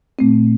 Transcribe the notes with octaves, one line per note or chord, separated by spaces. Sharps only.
A#2 A3 C4